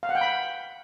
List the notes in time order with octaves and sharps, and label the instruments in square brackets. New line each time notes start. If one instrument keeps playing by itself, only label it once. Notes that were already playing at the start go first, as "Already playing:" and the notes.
[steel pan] F5
F#5
G5
B5